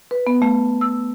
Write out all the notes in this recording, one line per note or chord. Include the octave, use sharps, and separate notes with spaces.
B4
B3
A3
E6